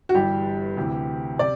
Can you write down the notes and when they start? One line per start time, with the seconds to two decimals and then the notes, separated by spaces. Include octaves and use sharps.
0.09 F#4
0.14 G1 G2 E3 G3 G4
0.77 D2 C3 E3
1.39 C3 D5